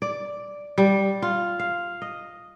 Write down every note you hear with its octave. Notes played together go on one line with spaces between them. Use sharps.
D5
G3
F4
F5
D#5